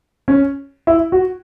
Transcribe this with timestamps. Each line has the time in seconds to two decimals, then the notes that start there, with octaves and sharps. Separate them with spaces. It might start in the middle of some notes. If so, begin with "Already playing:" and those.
0.28 C#4
0.87 E4
1.12 F#4